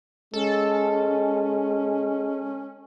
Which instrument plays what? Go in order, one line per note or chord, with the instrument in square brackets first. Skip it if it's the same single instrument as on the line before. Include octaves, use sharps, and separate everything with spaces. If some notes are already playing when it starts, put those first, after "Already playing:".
[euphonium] G#3 [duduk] C#4 [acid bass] A4